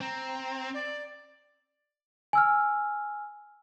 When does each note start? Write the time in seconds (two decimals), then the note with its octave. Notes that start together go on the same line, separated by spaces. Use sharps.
0.01 C4 A#5
0.73 D5
2.33 G#5 E6 F6